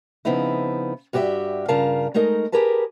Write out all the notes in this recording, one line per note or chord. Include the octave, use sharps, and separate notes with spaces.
C#3 F3 B3 C4 D#4 E4
G2 F#4 G4 B4 E5
G2 C#3 F4 A#4 F5 A5
G#3 A3 D#4 A#4 D#5
G4 G#4 A#4 B4 A5